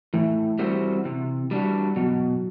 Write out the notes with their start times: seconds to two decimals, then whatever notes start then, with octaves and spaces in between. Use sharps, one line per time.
0.14 A2 E3 E4
0.59 G3 C4 F#4
1.05 C3
1.51 G3 D4 F#4
1.96 B2 F#3 F#4